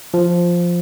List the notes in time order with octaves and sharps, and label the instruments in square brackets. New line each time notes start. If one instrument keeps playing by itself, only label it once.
[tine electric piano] F3